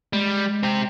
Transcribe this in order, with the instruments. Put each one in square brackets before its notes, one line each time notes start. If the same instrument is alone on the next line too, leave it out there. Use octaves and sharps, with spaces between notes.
[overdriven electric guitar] G3 [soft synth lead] G#3
[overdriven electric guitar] C4 G4